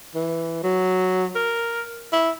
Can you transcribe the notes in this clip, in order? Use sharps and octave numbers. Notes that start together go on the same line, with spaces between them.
E3
F#3
A#4
E4